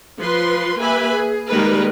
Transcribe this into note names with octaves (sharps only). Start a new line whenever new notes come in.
F3 B4 C6
A#3 G4 B4 E5 G#5 B5
G#4
D#3 G3 G#3 A#3 A#4 B4